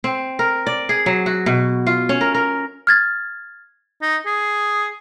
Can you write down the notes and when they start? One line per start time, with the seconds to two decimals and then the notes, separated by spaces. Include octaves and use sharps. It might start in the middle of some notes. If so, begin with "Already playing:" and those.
0.04 C4
0.39 A#4
0.67 D5
0.89 G#4
1.06 F#3
1.26 F#4
1.46 B2
1.87 F4
2.09 C#4
2.21 A#4
2.35 A#4
2.87 F6 G#6 A6
4.02 D#4
4.26 G#4